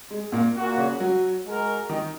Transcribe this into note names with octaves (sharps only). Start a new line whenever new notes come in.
G#3
A#2 A#3
A#2 A#3 F#4
C#3 C#4
F#3 F#4
G#3 F#4 A#4
D#3 D#4